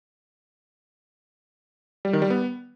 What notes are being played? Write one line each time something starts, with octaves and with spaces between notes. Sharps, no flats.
G3
D#3
G3
B3